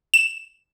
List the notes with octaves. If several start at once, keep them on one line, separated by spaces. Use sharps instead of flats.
E7